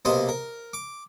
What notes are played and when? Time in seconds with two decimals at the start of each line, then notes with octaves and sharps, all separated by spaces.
0.05 B1 C3 A#3 C5 D#5 D#6
0.29 A#4
0.73 D6